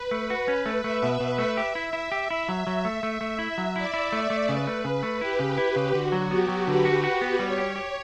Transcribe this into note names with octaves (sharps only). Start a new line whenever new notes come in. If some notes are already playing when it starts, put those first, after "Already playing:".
Already playing: B4
A3
F#4
C#4
A3
A3 E5
B2
B2
A3
G4 E5
E4
E4
G4
E4
F#3
F#3
A3
A3 E5
A3
E4
F#3
E4 D5
E4
A3
A3
C#3 B4
A3
C#3
A3
E4 G4
C#3
E4
C#3
D3 F#4
F#3
B3 G4
F#3
D3 B4
F#4
F#4
B3
G3 C#5
G4
G4